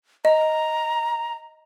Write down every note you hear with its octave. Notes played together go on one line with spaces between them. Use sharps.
D#5 A#5